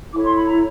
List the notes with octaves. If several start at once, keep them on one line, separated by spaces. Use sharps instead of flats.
E4 A4 C#5 D6
C6
B5
A#5